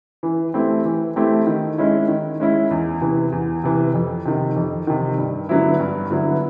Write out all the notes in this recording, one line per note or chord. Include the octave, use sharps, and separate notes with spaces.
E3
A3 C4 E4 G4
E3
A3 C4 E4 G4
D#3
G#3 C#4 E4
D#3
G#3 C#4 E4
E2
C3 E3
E2
C3 E3
F2
C3 D#3
F2
C3 D#3
G2
D3 F#3 B3 E4
G2
D3 F#3 B3 E4